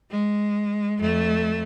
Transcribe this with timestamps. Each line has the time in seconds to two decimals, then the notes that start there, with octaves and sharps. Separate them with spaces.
0.11 G#3
1.00 F2 A3